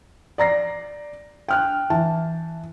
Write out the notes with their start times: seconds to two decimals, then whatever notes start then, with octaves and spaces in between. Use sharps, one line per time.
0.38 D5 A#5 A#6 C7
1.48 G5 F6 F#6
1.90 E3 A5